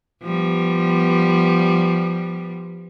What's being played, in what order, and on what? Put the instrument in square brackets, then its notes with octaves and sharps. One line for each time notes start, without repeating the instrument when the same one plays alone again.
[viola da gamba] F3 G3 B3